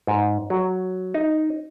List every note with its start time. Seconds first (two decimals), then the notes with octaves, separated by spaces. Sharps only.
0.07 G#2
0.50 F#3
1.14 D#4